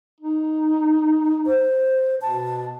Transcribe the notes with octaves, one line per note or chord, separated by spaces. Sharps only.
D#4
C5
B2 A5